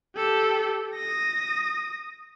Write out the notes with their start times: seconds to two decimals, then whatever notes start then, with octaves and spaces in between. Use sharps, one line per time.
0.16 G4 A4
0.95 D#6 A#6